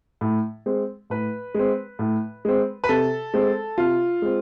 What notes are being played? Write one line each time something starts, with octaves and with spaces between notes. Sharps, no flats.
A2
G#3 C4
A2 B4
G#3 C4
A2
G#3 C4
B4
C3 A4
G#3 C4
C3 F4
G#3 C4